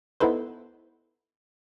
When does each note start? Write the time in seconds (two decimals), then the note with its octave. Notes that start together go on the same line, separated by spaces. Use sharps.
0.20 B3 D#4 E4 A4 B4 C5